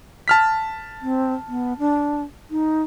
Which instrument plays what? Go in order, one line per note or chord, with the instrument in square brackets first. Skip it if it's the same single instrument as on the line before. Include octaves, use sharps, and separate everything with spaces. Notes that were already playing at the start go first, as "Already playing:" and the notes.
[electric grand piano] A5 F6 B6
[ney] C4
B3
D4
D#4